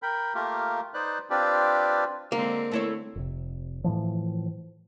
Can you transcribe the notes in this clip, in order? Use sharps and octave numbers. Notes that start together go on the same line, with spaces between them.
A#4 G5 B5
A3 A#3 F4 G4 A#4
D#4 B4 C5 D5 F#6
C4 D4 F4 G4 B4 D5
D3 G#3 A#3 C4
A3 E4 C#5
F1 C3
A2 E3 F3